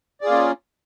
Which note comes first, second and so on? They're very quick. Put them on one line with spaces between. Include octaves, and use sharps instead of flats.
D5 G#4 F4 A#3 C#4